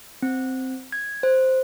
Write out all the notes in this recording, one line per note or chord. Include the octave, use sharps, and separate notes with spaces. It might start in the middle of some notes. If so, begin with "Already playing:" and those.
C4
G#6
C5